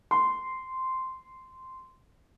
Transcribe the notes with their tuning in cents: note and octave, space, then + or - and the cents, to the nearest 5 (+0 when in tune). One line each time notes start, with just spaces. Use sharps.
C6 -10